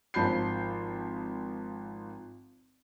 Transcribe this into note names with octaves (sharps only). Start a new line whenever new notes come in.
G#1 F3 A5 B5 G6 C7